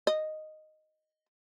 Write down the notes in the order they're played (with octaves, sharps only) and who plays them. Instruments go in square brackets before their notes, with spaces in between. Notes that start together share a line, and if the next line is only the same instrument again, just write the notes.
[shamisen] D#5